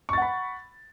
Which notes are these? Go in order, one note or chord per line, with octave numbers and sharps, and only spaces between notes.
F#5 B5 C#6 A6